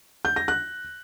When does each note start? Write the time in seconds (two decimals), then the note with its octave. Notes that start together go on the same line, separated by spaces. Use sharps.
0.25 G6
0.36 A#6
0.48 F#6